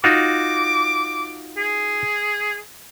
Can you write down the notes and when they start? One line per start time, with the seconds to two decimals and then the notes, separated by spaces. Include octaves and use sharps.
0.04 D#4 F4 F#4 D6
1.57 G#4